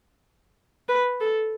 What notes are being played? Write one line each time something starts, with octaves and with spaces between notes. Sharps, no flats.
B4
A4